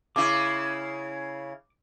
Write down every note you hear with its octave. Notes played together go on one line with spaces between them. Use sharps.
C#3 E4 D6